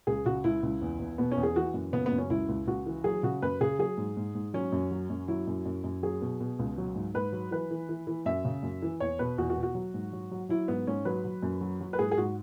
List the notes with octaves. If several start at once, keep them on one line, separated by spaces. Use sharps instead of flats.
C#2 G#4
C#3 F#4
C#2 E4
C#2
E2
E2
B2 B3
C#4
E2
G#4
E3 F#4
F#2
C#3 B3
B3
F#2
C#4
C#2 E4
C#2
C#2 F#4
E3
F#3 G#4
C#3 F#4
F#2 B4
C#3 G#4
F#3 G#4
G#2
G#2
G#2
F#3 C#4
F#2
F#3
F#2
F#3 E4
F#2
F#2
F#2
F#3 G#4
B2
B2
C#2
F#3
G#2
G#2 B4
F#3
E3 B4
E3
E3
E3
F#2 E5
C#3
F#2
E3
E2 C#5
B2 B4
E2 F#4
F#4
B2
F#4
F#3
G#2
F#3
F#3
F#3 E4
G#2 B3
G#2 C#4
F#3 B4
F#3
F#2
F#3
F#3
B4
G#2 G#4
G#4
G#2 F#4